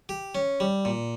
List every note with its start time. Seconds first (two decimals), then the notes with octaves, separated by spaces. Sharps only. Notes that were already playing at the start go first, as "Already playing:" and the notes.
0.09 G4
0.35 C#4
0.60 G3
0.85 A#2